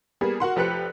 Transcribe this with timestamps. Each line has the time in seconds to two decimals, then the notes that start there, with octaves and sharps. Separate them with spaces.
0.21 G3 A#3 B3 G#4
0.40 F#4 A#4 F#5 C6
0.56 F1 F3 G4 B4 F#6 C#7